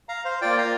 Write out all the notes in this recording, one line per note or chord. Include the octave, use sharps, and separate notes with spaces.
F5 A#5
C5 F5
A#3 F4 D5 G5
F5 A#5